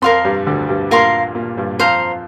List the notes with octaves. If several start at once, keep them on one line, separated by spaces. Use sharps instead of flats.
F2 F3 A#4 F5 C6
G2 G3
D2 D3
G2 G3
A#2 A#3 A#4 F5 C6
A#2 A#3
G2 G3
F2 F3 C5 F5 A#5